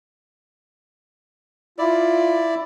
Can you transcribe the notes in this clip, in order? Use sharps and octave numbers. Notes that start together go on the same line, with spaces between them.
E4 F4 D5